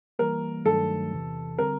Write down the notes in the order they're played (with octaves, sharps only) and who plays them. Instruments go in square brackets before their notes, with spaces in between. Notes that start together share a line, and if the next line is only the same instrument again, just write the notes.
[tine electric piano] E3 G3 A#3 [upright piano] A#4
[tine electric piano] G2 D#3 F#3 A3 [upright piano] A4
[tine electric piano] E2 C3 E3
[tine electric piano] D3 G3 C4 [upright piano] A#4